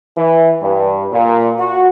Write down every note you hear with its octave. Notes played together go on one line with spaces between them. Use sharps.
E3
G2
A#2
F#4